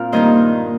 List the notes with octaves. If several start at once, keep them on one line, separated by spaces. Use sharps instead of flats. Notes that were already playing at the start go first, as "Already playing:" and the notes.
Already playing: A#2 C4 F4 F5
G2 D#3 A#3 D#4 C5 D#5